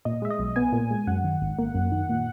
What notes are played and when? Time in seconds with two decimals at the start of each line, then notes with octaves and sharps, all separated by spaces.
0.05 A#2 D#5
0.22 G#3 E5
0.30 D#5
0.39 B1
0.56 B3 G#5
0.72 A#2
0.91 G#3
1.07 F#2 F#5
1.24 D#3
1.42 G#1
1.59 A#3
1.75 F#2
1.92 D#3
2.09 A#2